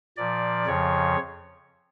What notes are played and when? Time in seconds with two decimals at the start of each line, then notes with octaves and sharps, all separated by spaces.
0.17 A#2 F3 D5
0.66 F2 C#3 F3 C#5